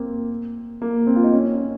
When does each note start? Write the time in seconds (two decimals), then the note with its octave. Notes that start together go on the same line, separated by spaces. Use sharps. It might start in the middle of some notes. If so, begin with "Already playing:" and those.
Already playing: A#3 C4
0.82 A#3
1.07 C4
1.16 F4
1.24 D#4
1.33 C#4
1.58 C#4